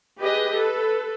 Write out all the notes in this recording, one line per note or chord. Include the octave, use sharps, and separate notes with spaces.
G4 G#4 B4 D#5
A4 B4